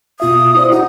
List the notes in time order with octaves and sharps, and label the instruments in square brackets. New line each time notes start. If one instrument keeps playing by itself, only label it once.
[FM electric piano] B2 F4 E5 [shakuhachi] D#6
[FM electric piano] E4 C5 D5
[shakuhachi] D#4 [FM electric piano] E4 F#4 F#5